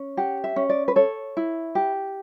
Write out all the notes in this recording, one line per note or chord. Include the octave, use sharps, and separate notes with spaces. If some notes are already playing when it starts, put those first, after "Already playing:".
Already playing: C#4
G4 F#5
E5
C#4
D5
B4
A4 C#5
E4
G4